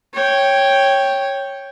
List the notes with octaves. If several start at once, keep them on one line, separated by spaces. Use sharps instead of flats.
C#5 G5